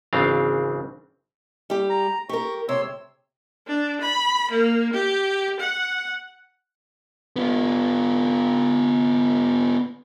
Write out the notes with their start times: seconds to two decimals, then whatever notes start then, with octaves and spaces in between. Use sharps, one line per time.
0.13 G#1 C#3 E3 C4 D4 F5
1.70 G3 G4
1.90 A#5
2.29 G4 A#4 C#6
2.69 C3 C#5 C6 E6
3.67 D4
4.01 B5
4.51 A#3
4.93 G4
5.59 F#5
7.36 B3 F4